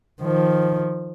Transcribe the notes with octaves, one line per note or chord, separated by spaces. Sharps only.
D#3 F3